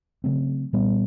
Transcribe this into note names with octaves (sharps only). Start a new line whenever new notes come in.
C#3 F#3 A3 C4
A#2 G3 B3